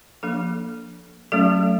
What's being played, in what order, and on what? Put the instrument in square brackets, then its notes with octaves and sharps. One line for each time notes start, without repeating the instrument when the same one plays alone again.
[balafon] F3 A#3 D4 A4
F#3 A3 C#4 A4